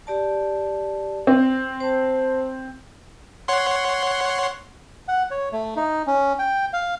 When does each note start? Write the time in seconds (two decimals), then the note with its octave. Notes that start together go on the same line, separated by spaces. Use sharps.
0.07 G4 D5 A5
1.27 C4
1.80 C5 A5
3.48 C#5 F#5 C6
5.08 F#5
5.31 C#5
5.52 A3
5.76 D#4
6.07 C#4
6.39 G5
6.73 F5